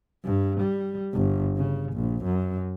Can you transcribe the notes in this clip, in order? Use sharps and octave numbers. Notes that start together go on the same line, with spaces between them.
G2
G3
G1
C#3
A#1
F#2